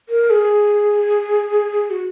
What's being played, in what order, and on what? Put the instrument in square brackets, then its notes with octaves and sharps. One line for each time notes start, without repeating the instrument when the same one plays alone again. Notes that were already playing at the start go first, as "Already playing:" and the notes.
[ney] A#4
G#4
F#4